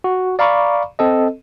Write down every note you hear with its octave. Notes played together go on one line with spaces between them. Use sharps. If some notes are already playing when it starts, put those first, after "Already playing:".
F#4
D5 F5 A#5 B5 C#6 D6
C4 A4 D#5